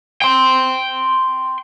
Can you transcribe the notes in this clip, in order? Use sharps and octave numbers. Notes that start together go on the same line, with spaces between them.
G5 C6